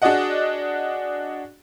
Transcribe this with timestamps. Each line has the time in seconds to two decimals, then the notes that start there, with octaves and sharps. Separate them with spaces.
0.02 D4 F#4 G#4 D5 D#5 F#5